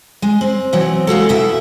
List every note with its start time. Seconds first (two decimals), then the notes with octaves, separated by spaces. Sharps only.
0.22 G#3
0.41 C4
0.73 B2 E3 F#3 C4
1.07 G#3 A#3 F#4 A4
1.29 B2 E4 E5